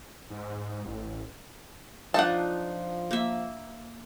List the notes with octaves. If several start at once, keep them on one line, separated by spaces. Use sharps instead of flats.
G#2
A1
F3 D4 D#4 F4 F#5 A5
A#3 E5